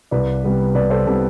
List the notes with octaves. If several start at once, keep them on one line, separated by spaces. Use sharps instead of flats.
C2 B4 D5
C3 G3 B3
C2 B4 D5
A4 C5
C3 G3 B3 A4